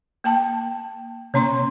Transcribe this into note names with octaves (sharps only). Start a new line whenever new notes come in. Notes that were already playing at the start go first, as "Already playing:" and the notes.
A#3 G5 A5
C3 A#3 C#4 C#5 C6